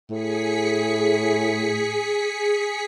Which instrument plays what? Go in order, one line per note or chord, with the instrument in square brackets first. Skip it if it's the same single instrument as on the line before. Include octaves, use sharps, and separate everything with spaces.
[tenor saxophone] A2 [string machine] G#4 B6 C#7